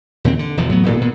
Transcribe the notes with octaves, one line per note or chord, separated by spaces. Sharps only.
D#2 A#2 C#3 C4
D3
E1 E2 F3
A2 F#3 B3
D#1 G#1 A#2
A#2 B3